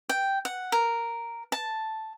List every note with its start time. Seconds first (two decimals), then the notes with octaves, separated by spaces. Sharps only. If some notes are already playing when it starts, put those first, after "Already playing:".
0.09 G5
0.45 F#5
0.72 A#4
1.52 A5